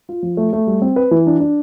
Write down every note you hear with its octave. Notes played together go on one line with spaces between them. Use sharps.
F4
F3
A3
A3
G3
C4
B4
E3
D4
D4